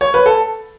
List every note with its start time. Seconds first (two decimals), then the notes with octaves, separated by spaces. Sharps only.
0.01 C#5
0.14 B4
0.26 A4